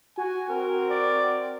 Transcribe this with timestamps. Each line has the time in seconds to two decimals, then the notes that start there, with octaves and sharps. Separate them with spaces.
0.18 F#4 G#5
0.49 C4 A#4
0.90 D5